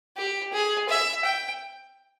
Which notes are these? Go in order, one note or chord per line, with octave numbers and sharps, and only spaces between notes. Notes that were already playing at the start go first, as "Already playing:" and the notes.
G4
G#4
E5
G5